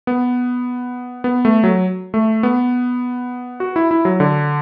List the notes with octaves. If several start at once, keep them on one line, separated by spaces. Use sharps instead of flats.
B3
B3
A3
F#3
A3
B3
F#4
E4
E4
F#3
D3